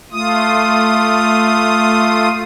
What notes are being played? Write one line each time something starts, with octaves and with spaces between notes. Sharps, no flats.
A3 F4 D#6